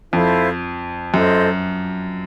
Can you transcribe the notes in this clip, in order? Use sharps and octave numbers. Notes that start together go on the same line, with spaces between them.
F2 E4 A4 C5 F5
F#2 F4 A4 C5 D#5